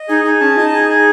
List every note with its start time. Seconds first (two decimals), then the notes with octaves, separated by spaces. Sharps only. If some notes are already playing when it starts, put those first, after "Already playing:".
Already playing: D#5
0.08 D#4 G#4
0.25 D#4 G#4
0.41 C#4 A5
0.57 D#4 F4 D#5
0.73 G#4
0.89 G#4